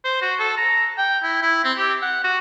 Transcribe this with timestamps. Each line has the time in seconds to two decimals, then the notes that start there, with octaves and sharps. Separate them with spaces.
0.05 C5
0.22 F#4
0.39 A4
0.58 A#5
0.98 G5
1.23 E4
1.42 E4
1.64 C4
1.77 G4
2.02 F#5
2.24 F#4